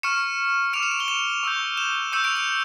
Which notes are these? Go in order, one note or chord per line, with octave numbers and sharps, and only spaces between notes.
C#6 F6 C#7 E7
D6 F6 D7 F7
C#7 E7
D7 F7
E7 G7
D7 F7
C#6 E6 G6
E7 G7
C#6 E6 G6 C#7 E7
D7 F7
D7 F7